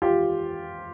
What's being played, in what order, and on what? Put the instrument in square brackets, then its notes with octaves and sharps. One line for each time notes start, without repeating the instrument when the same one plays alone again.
[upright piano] F4 G4